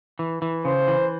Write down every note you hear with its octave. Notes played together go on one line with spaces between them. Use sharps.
E3
E3
C#3 C5
E3